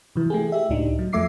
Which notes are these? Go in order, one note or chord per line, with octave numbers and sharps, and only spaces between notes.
C3 E3
A3 G4 G#4
G4 E5
C#2 A2 D4 D#4
F#3
F2 F3 A3 E5 D6 C7